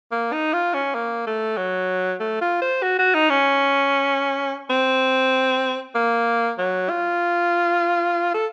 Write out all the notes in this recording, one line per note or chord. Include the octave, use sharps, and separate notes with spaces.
A#3
D#4
F4
C#4
A#3
A3
F#3
A3
F4
C5
F#4
F#4
D#4
C#4
C4
A#3
F#3
F4
A4